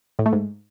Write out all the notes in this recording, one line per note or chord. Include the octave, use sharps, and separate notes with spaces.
A2
A3
G#2